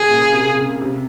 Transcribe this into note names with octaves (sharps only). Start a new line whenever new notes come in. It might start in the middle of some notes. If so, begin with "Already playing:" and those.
Already playing: C#3 G#4
A#2
C3
C#3
C3